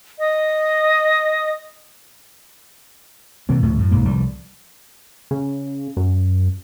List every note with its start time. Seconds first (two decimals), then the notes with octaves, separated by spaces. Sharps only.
0.19 D#5 D#6
3.49 C3 E3 A#3
3.62 D2 A2 F3 A3
3.79 F#2 A2
3.91 B1 G#2 A#3
4.05 C2 F3 G3
5.31 C#3
5.97 F#2